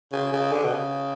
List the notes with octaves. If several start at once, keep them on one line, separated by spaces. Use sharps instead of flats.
C#3
C#3
D3
B2
C#3